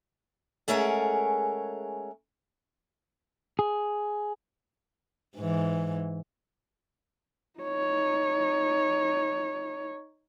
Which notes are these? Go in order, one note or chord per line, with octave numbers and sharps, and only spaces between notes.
G#3 A3 C#4 G#4 A#4 F#5
G#4
G#2 E3
D#4 C#5